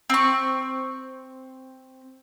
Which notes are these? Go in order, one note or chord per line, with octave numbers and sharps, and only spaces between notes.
C4 C#6